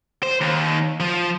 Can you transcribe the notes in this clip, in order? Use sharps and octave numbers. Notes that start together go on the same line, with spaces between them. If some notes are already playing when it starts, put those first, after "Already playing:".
C5
D#2
F3